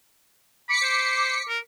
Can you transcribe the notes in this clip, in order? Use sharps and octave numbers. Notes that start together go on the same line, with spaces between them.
B5 D6 B6 C#7
C5
A#4